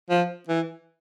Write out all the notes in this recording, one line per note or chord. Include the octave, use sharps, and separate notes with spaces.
F3
E3